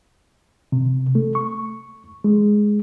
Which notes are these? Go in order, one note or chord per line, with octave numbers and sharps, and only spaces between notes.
C3
A3
C#6
G#3